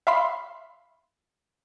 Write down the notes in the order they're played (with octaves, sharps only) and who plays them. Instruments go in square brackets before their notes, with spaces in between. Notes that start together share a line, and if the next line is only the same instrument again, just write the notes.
[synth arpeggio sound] E5 F5 B5 C6